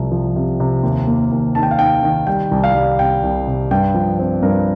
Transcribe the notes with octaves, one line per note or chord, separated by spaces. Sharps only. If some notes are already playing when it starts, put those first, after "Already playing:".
Already playing: C2 C3 F3
F3
C3
C3
D#2
A#3
D#2
D#3 A5
G5
F5
D#3 G5
D#3
G3 G5
C2
F5
G3
C3 G5
C2
C3
G2 G5
F3
C4
G2 A#4